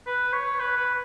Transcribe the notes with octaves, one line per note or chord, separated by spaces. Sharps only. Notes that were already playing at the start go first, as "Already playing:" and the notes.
B4
C#5
B4
B4